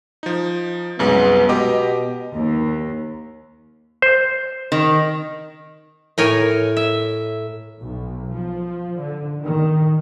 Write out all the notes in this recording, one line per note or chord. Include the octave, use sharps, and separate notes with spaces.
F3 D#4
C2 F#2 G#3 B3
B2 G4 D#5 D6
D#2
C5
D#3
A2 A#4 C#5 G#5
E5
B1
F3
D3
D#3